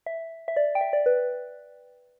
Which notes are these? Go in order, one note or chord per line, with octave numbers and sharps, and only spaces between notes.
E5
E5
D5
G5
E5
D5
B4